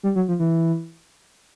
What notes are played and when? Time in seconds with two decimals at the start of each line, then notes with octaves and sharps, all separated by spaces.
0.03 G3
0.16 F#3
0.28 F3
0.39 E3